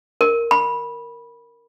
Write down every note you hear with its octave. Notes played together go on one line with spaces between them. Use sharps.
A#4
B5